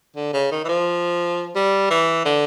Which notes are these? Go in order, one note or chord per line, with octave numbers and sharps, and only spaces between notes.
D3
C#3
D#3
E3
F3
G3
E3
D3